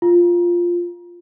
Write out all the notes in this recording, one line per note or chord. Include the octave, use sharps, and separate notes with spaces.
F4